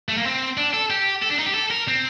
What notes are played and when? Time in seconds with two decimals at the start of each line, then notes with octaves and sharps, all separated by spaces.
0.09 A3
0.17 A#3
0.26 C4
0.57 D4
0.73 A4
0.90 G4
1.22 A4
1.30 D4
1.39 D#4
1.46 G4
1.54 A4
1.71 A#4
1.88 C4